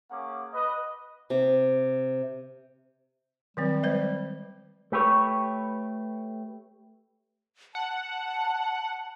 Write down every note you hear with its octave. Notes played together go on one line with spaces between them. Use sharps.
A#3 C#4 G#4 F#5 D6
B4 D#5
C3
D#3 F#3 G3 C4
G#3 B4 C5
A3 G4 B4 C#5
F#5 A5